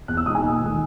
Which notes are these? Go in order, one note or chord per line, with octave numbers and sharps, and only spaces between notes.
E2 F#6
E6
B2 G#3 D#4 D#6
G#5
D#2
D#3 A3 D#4